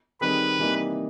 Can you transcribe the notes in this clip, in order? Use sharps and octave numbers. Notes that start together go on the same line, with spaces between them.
D#3 G3 C4 D#4 G#4 B4
C3 E3 G3 A#3 D#4